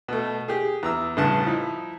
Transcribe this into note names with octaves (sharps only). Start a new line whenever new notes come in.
B2 A3
G4 G#4
E2 A#5 E6
A1 G2 C#3 A5
F3 D#4 E4